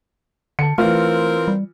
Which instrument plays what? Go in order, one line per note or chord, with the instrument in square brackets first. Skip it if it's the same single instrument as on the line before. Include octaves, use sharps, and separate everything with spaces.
[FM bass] D3 [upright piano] A5 C#7
[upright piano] E3 F4 [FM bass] A3 [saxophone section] C4 A#4
[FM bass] G3